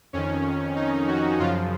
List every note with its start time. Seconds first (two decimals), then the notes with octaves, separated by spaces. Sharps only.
0.13 F2 D#3 C#4
0.76 D#4
1.08 F#4
1.39 F#2 C#3 F3 F4